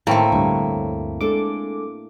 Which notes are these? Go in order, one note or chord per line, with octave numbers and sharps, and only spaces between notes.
A2 D#3 A3 A#3 C4 F4 A4
D2 G2 C#5
G#3 D4 A4 D6